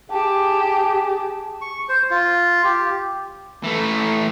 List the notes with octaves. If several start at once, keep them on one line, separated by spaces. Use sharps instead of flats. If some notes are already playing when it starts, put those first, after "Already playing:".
G4 G#4 A5
C#6
C5
F4
G4
E3 A3